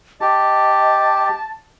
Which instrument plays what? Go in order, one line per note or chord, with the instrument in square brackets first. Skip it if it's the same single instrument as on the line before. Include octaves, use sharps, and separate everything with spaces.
[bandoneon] G4 [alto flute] D#5 [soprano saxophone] A5